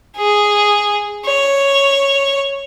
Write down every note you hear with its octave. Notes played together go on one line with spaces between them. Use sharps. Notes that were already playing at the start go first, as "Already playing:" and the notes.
G#4
C#5